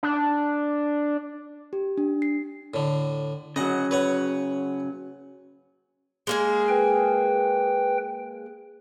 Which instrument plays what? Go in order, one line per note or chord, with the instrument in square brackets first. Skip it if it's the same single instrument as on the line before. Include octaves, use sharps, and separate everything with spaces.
[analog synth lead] D4
[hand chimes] G4
D4
C7
[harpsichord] A2 D3
[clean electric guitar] C#3 F#3 [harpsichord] D#5 F#5
[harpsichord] B4 C#5 F#5
[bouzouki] G#3 A#3 G#4
[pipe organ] B4 G5